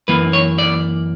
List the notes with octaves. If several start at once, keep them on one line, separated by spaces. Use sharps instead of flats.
F#2 E3 A#3 B4
C#5
D5